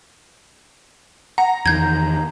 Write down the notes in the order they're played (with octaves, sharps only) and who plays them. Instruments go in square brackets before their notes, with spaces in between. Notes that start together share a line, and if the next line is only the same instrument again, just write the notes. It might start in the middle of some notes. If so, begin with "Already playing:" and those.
[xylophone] F#5 [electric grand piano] A#5
[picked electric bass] E2 D#3 [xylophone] G6 G#6